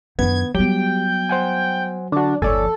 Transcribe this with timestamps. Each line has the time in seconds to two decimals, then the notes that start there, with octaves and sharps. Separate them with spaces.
0.19 F#2 D#3 B3 D4 G#6
0.55 F#3 G3 B3 G4 G5
1.29 C5 F#5 G#5
2.12 D3 D4 F#4
2.42 G1 D#2 F3 A4 C#5 D5 G#5